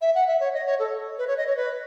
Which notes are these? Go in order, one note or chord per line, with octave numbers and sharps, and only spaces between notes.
E5
F#5
E5
C#5
D#5
C#5
A4
B4
C#5
D#5
C#5
B4